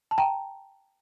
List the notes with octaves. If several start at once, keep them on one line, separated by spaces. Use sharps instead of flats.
A5
G5 A#5